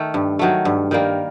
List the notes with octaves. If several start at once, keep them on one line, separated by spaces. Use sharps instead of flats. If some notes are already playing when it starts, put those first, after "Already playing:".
Already playing: D#3 A3
G2
D#3 F#3 A3
G2
D#3 G3 A#3